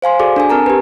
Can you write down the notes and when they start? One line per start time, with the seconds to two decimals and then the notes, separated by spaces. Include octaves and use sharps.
0.02 C5 F5 G#5 C6
0.19 F#4 G#4 A4 D5 D6
0.36 D4 A4 G#5
0.50 C4 A#4 A5 A#5
0.66 G4 B4